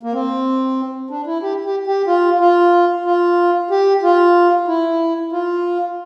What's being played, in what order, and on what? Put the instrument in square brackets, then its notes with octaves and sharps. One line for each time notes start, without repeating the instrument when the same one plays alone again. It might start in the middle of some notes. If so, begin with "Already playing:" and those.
[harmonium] A#3
C4
D4
E4
G4
G4
G4
F4
F4
F4
G4
F4
E4
F4